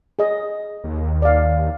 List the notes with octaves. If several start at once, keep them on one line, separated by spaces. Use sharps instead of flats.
G#4 D#5
D#2
D5 F5